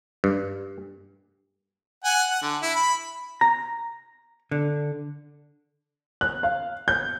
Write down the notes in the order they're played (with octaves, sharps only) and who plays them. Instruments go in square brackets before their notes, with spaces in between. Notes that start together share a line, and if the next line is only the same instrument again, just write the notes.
[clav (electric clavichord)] G2
[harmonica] F#5 G#5
F#5
D3
E4
B5
[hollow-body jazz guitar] A#5
D3
[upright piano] F#6
F5
G6